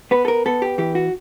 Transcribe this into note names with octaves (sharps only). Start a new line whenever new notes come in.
B3 B4
A4
A#4
B3 A4
G4
E3 G4
F#4